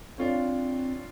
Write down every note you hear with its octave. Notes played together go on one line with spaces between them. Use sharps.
C4 D4 F4 C#5